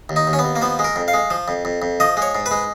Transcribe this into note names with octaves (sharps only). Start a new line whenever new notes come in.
D#2
D#4
D#2
C#4
B3
D#2
A#3
F3 B3
G#3
A#4
F2
F5
G#3
F3
F2
F2
F2
F3 D#5
G#3 C#5
G#2
B4
G#3